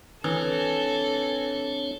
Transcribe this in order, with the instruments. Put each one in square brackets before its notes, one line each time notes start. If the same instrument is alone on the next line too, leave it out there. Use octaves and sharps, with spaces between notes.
[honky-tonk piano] E3 [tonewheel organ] C4 D4 C#5 [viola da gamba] A4